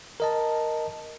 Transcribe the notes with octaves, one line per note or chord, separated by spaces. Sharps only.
A#4 D#5 A5